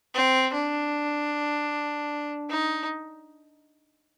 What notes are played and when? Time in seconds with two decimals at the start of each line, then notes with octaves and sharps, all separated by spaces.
0.15 C4
0.54 D4
2.50 D#4